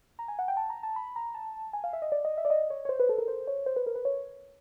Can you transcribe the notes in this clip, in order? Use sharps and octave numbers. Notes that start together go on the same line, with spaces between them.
A#5
G#5
F#5
G5
A5
A#5
A5
B5
A#5
A5
G#5
F5
E5
D#5
D5
D#5
E5
D5
D#5
C#5
C#5
C5
B4
A4
A#4
C5
C#5
C5
B4
A#4
B4
C#5